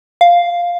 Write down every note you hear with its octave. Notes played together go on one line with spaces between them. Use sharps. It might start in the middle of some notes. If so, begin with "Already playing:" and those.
F5